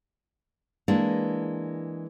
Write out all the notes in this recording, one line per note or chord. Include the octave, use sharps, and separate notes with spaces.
E3 G#3 A#3 D4